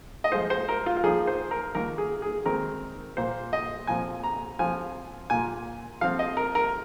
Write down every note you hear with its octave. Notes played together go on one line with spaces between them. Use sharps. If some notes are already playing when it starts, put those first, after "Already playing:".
D#5
F3 G#3 F4 C5
C5
A#4
F4
F4
F3 A#3 D#4 G#4
C5
A#4
D#3 A#3 F4 A#4
G#4
G#4
D#3 G#3 C4 D#4 A#4
A#2 A#3 F4 C5
D#5
A#2 F3 C4 G#5
A#5
F3 C4 F4 G#5
A#2 A#3 F4 G#5
F3 C4 F4 F5
D#5
A#4
A#4